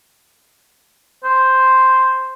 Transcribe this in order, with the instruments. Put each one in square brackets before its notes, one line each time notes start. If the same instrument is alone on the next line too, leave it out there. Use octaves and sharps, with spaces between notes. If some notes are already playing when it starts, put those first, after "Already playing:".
[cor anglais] C5